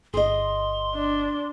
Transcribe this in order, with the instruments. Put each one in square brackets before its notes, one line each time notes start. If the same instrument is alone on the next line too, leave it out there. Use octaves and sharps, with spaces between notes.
[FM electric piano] G1 [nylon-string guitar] G#4 D#5 [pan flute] C6
[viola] D4